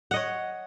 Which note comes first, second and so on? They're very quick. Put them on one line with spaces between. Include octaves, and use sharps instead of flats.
F#5 D#5 C#5